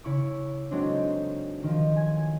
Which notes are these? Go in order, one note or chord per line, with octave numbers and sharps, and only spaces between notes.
C#3 E4 C#6 D6
F#3 G#3 A3 C4 D4 D#4
D#3 F3
G#5 G#6